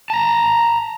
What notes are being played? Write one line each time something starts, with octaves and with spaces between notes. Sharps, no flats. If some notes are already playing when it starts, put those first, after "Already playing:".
A5 A#5